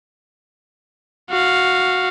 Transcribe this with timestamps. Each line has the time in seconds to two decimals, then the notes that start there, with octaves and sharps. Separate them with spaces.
1.29 F#4 F5